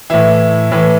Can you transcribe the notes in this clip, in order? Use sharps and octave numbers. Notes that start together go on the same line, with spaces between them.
A2 E3 E4
A2 E3